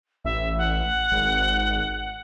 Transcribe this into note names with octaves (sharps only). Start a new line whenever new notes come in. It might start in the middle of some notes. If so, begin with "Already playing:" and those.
A1 E5
F#5
G#1